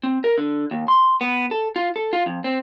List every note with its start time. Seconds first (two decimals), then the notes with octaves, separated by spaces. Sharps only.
0.03 C4
0.24 A#4
0.38 D3
0.71 D#2
0.88 C6
1.21 B3
1.51 A4
1.76 F4
1.96 A4
2.13 F4
2.26 F2
2.44 C4